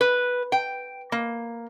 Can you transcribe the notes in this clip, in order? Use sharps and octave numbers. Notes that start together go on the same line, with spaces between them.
B4
G5
A#3